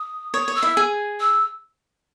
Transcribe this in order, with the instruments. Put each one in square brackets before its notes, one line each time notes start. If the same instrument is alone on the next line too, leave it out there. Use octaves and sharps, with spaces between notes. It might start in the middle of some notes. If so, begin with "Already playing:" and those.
Already playing: [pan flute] D#6
[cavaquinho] C#5 [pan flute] D#6
[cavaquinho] C#5
[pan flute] E6
[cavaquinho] E4 E5
G#4 G#5
[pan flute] E6